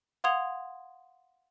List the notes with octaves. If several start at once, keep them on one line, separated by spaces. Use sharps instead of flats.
F5 F#5 C6 D#6 G#6 F7